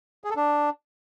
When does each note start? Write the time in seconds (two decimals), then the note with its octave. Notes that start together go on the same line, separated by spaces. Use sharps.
0.24 G#4
0.30 A4
0.36 D4